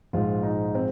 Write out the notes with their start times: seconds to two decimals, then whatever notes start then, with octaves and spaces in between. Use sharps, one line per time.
0.13 A#1 G#2 F3 G#3 F4
0.43 D#4
0.75 C4